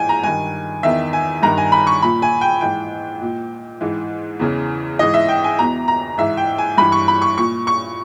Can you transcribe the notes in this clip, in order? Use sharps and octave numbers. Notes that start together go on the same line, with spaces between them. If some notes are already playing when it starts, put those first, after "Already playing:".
Already playing: G#2 E3 G5 G#5
A#5
G2 D#3 G#5
E2 D#3 E5
G#5
G2 D#3 A#5
G#5
B5
C#6
A#2 B5
G#5
G5
G#2 E3 G5
A#2
G#2 E3
E2 C#3 E3
G#2 E3 D#5
E5
G5
G#5
E2 B2 A#5
A#5
G#2 E3 E5
G5
G#5
G2 E3 B5
C#6
B5
C#6
A#2 C#6
C#6